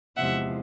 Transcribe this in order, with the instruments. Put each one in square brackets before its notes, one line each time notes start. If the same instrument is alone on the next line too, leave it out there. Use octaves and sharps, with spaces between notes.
[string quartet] E2 C3 F3 G#3 E5 F#5